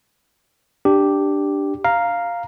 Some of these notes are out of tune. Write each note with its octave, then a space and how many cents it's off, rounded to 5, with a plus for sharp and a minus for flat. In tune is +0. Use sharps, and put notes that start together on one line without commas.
D4 +0 G4 +0
F5 +0 A#5 +0